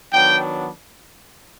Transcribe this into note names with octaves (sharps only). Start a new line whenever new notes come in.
D#3 F#3 B3 D4 G5